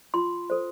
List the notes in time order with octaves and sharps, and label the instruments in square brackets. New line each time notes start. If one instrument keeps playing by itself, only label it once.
[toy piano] F4 C6
A4 C5